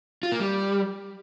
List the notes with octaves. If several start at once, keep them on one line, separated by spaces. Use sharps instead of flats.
F4
A#3
G3